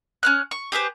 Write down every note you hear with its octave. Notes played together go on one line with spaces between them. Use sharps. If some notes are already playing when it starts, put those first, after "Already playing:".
C#4 F6 F#6
C#6
G4 G#4 B4 C5